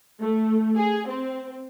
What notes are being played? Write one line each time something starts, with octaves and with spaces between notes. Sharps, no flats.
A3
G#4
C4